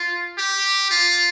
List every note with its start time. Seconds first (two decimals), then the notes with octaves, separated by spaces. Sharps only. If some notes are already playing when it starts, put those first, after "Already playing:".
Already playing: F4
0.38 G4
0.91 F4